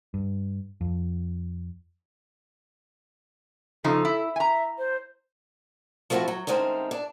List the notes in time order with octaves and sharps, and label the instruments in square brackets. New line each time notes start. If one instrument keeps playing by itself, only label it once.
[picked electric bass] G2
F2
[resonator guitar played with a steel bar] C#3 F3 D#4 [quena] A4
[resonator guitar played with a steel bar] E4
[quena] E5 [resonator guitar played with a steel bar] G#5 A#5
[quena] C5
[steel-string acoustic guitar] F3 A3 B3 C4 E4 F#4
F#3
D#3 G#3 A3 C4 C#4
D4